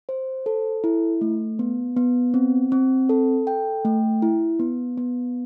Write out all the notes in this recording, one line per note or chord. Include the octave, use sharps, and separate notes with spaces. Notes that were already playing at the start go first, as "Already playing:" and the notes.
C5
A4
E4
A3
B3
B3
C4
C4
A4
G5
A3
E4
B3
B3